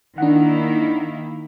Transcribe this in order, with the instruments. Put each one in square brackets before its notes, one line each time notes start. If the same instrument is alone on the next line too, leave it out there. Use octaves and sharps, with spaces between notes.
[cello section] D#3 A#3 E4 [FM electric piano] D4 F#5